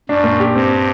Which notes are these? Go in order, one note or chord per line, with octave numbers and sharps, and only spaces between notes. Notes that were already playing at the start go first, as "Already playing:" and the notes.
F#2 D4
A#2
G4
G2 C4